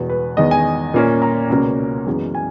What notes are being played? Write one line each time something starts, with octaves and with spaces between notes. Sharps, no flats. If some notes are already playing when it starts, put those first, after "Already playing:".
Already playing: E2 B2 G#3 B3
B4
E2 D#3 G#3 B3 D#5
G#5
A#2 A#3 C#4
A#5
C#2 B2 A#3 C#4
F#2 E3 G#3 B3
G#5